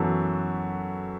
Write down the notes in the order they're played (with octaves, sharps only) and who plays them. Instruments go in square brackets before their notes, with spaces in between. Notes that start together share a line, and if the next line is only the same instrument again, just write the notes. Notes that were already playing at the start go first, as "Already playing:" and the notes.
Already playing: [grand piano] F#2 E3 B3 F#4 A4